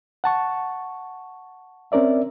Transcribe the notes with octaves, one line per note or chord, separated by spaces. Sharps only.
F#5 A5 C#6
C4 C#4 A#4 D5 E5